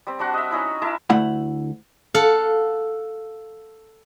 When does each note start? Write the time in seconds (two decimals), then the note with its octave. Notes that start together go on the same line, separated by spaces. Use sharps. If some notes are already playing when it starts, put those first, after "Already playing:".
0.07 G3 C4
0.19 G3 D4 F#4 F#5
0.34 D#5 E5
0.51 C#4 D#4 E4
0.82 E4 A#4 E5 A5
1.10 D2 A3 E4 F#5 B5
2.14 A4 F5 F#5